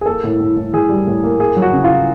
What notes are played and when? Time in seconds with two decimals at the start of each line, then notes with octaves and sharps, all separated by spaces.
0.01 G#4
0.06 A#3 A4
0.24 A2
0.40 A2
0.56 A2
0.73 E3 G#4
0.89 G3
1.07 A2
1.24 A#3
1.40 A#3 G#4
1.57 F#3
1.62 F#4
1.73 C#3
1.84 F4